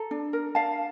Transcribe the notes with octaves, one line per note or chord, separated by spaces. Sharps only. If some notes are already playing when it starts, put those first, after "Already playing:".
Already playing: A4 A#5
D4
A#4
D4 F5 A5